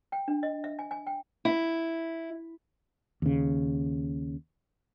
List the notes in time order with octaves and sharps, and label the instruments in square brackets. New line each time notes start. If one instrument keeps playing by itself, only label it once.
[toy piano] G5
D4
D#5
E5
G#5
G#5
G5
[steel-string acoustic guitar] E4
[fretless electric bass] D#2 C#3